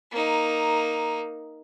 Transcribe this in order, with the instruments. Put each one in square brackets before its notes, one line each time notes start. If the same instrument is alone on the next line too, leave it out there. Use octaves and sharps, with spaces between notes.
[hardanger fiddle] A#3 D#4